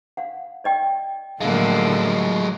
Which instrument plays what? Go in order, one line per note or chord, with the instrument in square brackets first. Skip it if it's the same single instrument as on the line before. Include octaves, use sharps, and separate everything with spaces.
[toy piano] F5 F#5
D5 D#5 G5
[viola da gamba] A2 F3 A#3 [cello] D3 [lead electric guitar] F#3 G#3 [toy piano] F5